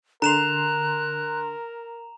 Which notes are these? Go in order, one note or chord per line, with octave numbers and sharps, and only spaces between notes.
D3 A#4 A#5 C6 F#6 E7 F7